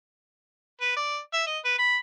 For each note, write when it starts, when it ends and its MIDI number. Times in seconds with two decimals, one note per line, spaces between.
0.81 0.96 71
0.96 1.19 74
1.33 1.46 76
1.47 1.58 75
1.65 1.76 71
1.78 1.97 83